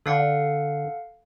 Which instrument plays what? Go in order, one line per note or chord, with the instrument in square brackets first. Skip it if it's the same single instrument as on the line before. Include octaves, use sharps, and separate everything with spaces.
[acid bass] D3 [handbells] A4 F5 F#5